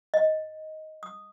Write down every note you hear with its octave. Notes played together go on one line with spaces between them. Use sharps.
D#5
D#6